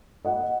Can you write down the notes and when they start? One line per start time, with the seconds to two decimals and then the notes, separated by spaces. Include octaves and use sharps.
0.25 D#5 F#5